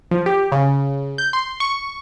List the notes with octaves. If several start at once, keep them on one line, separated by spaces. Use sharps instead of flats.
F3
G4
C#3
G6
C6
C#6